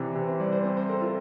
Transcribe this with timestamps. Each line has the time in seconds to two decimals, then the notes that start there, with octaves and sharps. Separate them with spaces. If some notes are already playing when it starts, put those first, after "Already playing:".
Already playing: C3 E3 D5
0.15 C3
0.28 C5
0.40 G3 D5
0.52 C5
0.64 C4
0.77 C5
0.89 A4 A#4
1.02 F4